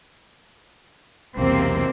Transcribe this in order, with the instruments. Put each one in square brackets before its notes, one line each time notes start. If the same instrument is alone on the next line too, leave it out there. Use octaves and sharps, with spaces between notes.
[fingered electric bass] B1 E2 [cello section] C3 A#3 C4